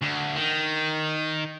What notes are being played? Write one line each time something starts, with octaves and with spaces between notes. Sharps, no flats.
D2
D#3